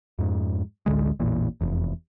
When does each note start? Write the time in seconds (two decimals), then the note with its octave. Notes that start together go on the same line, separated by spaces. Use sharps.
0.19 F2 G#2
0.86 A1 D2 D3 G#3
1.20 A1 E2 A#2
1.61 F1 E2